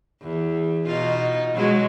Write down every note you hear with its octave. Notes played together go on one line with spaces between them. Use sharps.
E2
B2 D#4 F4
B2 F#3 G#3